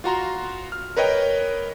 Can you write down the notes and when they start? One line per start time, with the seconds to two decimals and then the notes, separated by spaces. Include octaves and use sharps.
0.04 F4 F#4 A#5 C6
0.72 F6
0.97 A#4 B4 C#5 D#5 G5